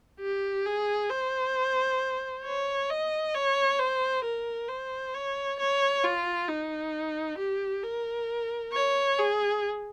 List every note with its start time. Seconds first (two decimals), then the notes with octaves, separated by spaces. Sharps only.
0.20 G4
0.66 G#4
1.10 C5
2.44 C#5
2.90 D#5
3.35 C#5
3.79 C5
4.24 A#4
4.69 C5
5.14 C#5
5.60 C#5
6.04 F4
6.49 D#4
7.38 G4
7.83 A#4
8.73 C#5
9.18 G#4